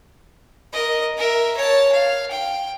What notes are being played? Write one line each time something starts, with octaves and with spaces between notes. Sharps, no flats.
A#4 D#5
A#4 E5
C#5 A5
F5
G5